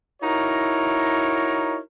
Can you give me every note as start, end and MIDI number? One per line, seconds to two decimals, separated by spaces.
0.22 1.79 63
0.22 1.79 64
0.22 1.79 66
0.22 1.79 70
0.22 1.79 73